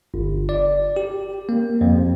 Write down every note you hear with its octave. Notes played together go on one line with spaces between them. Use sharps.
G1
D5
G4
A#3
F2